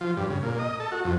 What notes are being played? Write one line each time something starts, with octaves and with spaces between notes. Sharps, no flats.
F3
G2
C#3
A#2
D#5
A4
F#4
F2